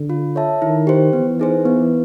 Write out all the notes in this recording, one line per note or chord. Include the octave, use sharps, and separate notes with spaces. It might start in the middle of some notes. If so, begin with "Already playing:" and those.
Already playing: D3
F4
A4 C#5 E5 A5
D#3 E4
G4 C5
E3 B3
D#4 G#4 C5
B3